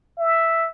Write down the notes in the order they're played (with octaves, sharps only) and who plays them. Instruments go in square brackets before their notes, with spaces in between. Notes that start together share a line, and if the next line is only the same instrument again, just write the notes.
[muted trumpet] E5